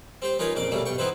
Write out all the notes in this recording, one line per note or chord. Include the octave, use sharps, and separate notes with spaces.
C4 G4 C5
C#4 D#4 F4 A#4 B4 G#5
A#1 F2 C#3 A#3 D5 D6
D2 B2 G3 A3 A#3 C#4
B1 G2 G5 C#6
B3 C4 D#4 E4 B4 C5